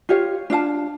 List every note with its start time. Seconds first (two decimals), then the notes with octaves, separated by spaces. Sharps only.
0.09 F4 G4 C#5 F5
0.50 D4 F4 F5 A5